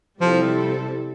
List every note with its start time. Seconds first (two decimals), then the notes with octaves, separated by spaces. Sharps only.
0.20 C3 F3 G3 C4 E4 A4